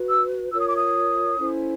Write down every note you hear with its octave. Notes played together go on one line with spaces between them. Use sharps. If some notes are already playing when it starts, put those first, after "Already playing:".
Already playing: F#4 B4
E6
F4 A#4 C#5 E6
D#6
D6
D#6
C#4 E4 A4 C5